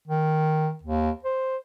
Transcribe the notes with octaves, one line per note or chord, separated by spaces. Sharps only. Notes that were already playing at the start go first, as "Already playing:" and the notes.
D#3
D#2
C5